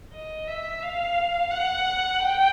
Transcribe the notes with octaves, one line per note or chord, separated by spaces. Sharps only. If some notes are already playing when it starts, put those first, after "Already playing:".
D#5
E5
F5
F#5
G5